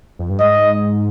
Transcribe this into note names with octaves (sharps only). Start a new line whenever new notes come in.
F2
G2
G#2 D#5